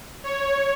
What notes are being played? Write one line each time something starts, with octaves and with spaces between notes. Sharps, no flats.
C#5